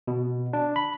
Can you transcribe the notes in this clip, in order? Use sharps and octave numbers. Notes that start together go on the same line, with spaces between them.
B2
D4
B5